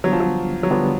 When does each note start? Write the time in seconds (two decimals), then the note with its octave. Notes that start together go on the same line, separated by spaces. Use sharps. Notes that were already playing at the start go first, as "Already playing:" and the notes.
0.04 D3 F#3 G3 B3 D4
0.12 F3
0.20 F#3
0.63 F#3
0.71 D3 F3 G3 B3 D4